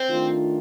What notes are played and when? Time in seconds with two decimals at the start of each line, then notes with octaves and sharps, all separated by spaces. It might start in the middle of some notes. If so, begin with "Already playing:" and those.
Already playing: C4 C5
0.09 D#3 A3 D4 F4